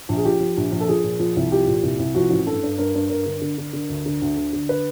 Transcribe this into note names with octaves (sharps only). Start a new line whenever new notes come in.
A#1
G#4
F3 G4
F3
A#1
A#1
A4
F3 G#4
A#2
F3
C2
F3 G4
A#2
C2
C2
F3 F#4
A1
G2 A4
G2
G2 A#4
G2
G2 A#4
D3
D3
D3
D3
D2
D3
D2
D3
D3
B4